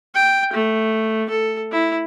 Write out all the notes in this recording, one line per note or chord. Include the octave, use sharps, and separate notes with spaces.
G5
A3
A4
E4